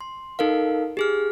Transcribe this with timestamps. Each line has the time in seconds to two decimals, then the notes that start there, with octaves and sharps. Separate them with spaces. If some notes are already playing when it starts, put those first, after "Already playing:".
0.01 C6
0.39 D#4 A4 A#4 F5
0.97 G4 G#4 F6